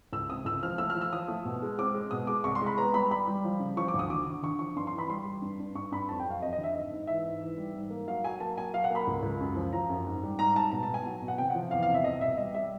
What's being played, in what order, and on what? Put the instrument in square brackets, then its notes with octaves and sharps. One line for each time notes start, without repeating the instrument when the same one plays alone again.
[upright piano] C#2 E6
C3 D#6
C#2 E6
F3 F6
A3 E6
F6
F3
E6
F3 D#6
A3
B2
G#3
C4 D6
G#3
B2 D#6
G#3 D6
C2 C#6
C6
G#3 B5
B3 A#5
G3 B5
G3 B5
G3
F3
C#3
F3 C#6
D6
D2
D#6
D3 D6
D3
D3 C#6
F3 C#6
G2 C6
C6
E3
B5
G3 C6
G3
G2
G2
G2 C#6
G2 B5
F2 A5
G5
F#3
F5
F2 D#5
D#5
D3
E5
G#2 D#5
G#2
E3 E5
G#2
E3
G3
G#2
A#3
F#3 F5
F#3 G#5
A#3 A5
F#3 G#5
F#3 F5
F#5
A#3 B5
C#2
C#2
F#2
F3
F3 A#5
F#2
G#2
G3
G#2 A#5
G#2 A5
B2 A#5
A5
B2
G#5
F#3
B2
F#5
C3 G5
F#5
F3
E2 F5
F5
C3
E5
C2 D#5
B2 E5
G3 D#5
G3 E5